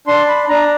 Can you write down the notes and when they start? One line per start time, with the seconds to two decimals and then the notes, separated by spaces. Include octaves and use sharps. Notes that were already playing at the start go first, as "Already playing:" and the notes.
0.07 D4 C6
0.28 B5
0.49 D4 A#5